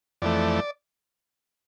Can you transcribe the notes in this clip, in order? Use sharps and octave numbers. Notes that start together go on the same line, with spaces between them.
F2 E3 A3 D5